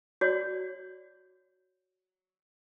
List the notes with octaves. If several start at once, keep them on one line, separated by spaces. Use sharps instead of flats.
F#4 C#5 D5